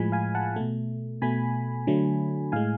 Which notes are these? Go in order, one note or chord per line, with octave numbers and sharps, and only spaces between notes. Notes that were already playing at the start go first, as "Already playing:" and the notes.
Already playing: A2 F3 G#3 G#5 B5
F5 G#5
F#5 A5
B2 A3
B2 A3 G#5 B5
D3 F#3 A3
A2 G#3 F5 G#5